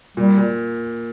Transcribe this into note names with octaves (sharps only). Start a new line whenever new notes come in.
A#2 G3
A#2